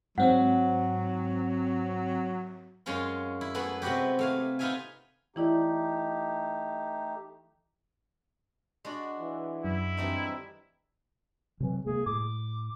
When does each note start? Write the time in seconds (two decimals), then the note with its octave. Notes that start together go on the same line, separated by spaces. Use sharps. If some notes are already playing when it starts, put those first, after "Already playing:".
0.18 G#2 F#3 C4 F#5
2.86 F#2 G#3 C#4 F4 C6
3.41 E4
3.54 A3 B3 E4 G#4 B4
3.82 C3 G#3 B3 F#4 G4
4.19 A3 F5 G#5
4.59 B3 D#4 F4 E5 F5 G#5
5.36 E3 A3 D#4 E4 G4 D5
8.85 G#3 D4 F#4
9.19 E3
9.64 F#2 E4
9.97 D2 E3 G3 C4 D4 D#4
11.60 C3 E3 F#3
11.86 C3 G#3 A#3 G#4
12.06 A2 D6